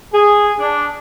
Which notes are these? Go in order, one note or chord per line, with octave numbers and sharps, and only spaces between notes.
G#4
D4